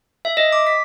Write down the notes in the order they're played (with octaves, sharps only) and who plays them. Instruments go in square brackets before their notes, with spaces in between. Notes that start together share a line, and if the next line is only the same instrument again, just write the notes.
[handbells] E5
D#5
D6
B6